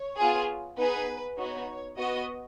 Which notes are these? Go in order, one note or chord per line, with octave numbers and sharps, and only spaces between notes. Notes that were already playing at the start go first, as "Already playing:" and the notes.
Already playing: C#5
B3 F4 G#4
B3 D#4 G#4 B4
B3 D#4 F#4 C#5
B3 F#4 D#5